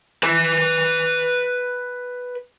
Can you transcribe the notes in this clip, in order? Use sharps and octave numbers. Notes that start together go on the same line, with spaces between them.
B4 G#5